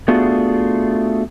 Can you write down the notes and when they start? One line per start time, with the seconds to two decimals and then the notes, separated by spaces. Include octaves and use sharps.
0.08 A3 B3 D4 F4 F#4 G#4